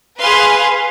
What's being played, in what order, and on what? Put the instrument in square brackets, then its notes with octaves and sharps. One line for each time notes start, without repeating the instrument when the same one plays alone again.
[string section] G#4 B4 F5 C6